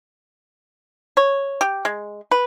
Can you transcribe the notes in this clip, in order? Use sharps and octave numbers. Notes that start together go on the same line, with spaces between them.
C#5
G4
G#3
B4